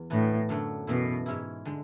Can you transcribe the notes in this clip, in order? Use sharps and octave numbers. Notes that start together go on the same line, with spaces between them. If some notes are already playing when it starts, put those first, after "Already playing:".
Already playing: E2
A2 E3 B3 D4 F#4
F#2 D3 F#3 A3 D4
F#2 B2 E3 A3 E4
G#2 G#3 C#4 E4
D3 G#3